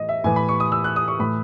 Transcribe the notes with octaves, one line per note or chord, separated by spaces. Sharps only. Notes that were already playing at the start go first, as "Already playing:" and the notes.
Already playing: A2 E3 D#5
E5
A2 E3 G#5
B5
C#6
D#6
E6
F#6
D#6
C#6
A2 E3 B5